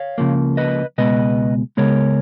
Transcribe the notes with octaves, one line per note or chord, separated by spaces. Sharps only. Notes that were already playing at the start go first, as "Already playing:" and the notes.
Already playing: C#5 F5
C#2 C#3 F3 A#3
B4 D#5
C#2 B2 G#3 B3 B4 D#5
C#2 C#3 G#3 B3 A#4 C#5